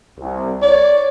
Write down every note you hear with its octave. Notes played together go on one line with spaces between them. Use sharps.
C2
C#5 D5